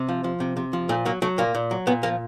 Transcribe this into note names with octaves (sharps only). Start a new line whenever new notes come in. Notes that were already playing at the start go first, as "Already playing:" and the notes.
Already playing: C3
F3
F3
C3
C3
F3
A#2 A3
F#3 A#3
F#3 A3
A#2 A#3
A#2
F#3
A#2 B3
F3 A#3